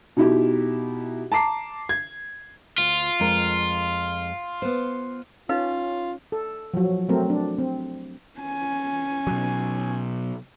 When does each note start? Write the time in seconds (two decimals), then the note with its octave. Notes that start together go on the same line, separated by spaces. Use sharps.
0.17 B2 D#4 E4 G4
1.32 A5 A#5 D6 C7
1.89 G#6
2.78 D2 F4
3.20 F2 G#3 A#4
4.62 B3 C5
5.49 C#4 D#4 F4 B4 F5
6.32 A4
6.74 F3 F#3
7.09 F#3 A3 C4 A#4
7.30 D4
7.58 C4
8.39 C#4 G#5
9.27 B2 F#3